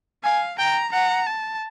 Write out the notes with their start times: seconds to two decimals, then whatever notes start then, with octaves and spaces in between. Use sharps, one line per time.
0.24 F5 G#5
0.59 G5 A#5
0.93 F#5 A#5
1.27 A5